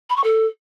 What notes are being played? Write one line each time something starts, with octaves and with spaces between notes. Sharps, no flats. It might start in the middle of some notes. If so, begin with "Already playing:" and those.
B5
C#6
A4